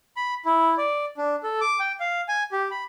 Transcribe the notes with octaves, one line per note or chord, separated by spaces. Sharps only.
B5
E4
D5
D4
A4
D6
G5
F5
G#5
G4
B5